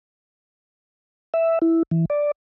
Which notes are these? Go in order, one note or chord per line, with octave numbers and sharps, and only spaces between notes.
E5
E4
E3
D5